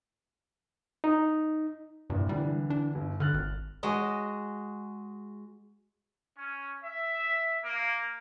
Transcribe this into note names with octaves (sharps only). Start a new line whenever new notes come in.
D#4
C2 G2 A#2
C2 D3 E3 G3
D4
G1
D3 F6 F#6 A6
G#1
G#3 F#4 D#5
C#4
E5
A#3